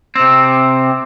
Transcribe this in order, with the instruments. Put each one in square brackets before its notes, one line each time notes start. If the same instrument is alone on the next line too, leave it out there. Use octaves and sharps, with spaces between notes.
[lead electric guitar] C3 C4